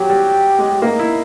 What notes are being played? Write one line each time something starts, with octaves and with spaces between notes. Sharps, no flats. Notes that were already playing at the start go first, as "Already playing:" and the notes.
Already playing: F#3 G4
G3
G#3
A#3 D#4
E4